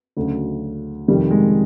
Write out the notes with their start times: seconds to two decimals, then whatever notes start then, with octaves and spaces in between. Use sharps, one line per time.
0.17 D2 C#3 F#3
1.08 F2 C3 D#3 G3
1.31 G#3